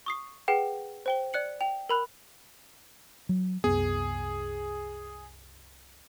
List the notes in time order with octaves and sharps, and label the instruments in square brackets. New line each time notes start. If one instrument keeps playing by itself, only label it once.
[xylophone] C#6 D#6 C7
G#4 B4 F#5 G5
C5 G5 G7
D5 F#6 C#7 F#7
G5 F7
A#4 B5 F#6
[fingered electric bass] F#3
[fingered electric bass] C2 F#2 B3 [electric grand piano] G#4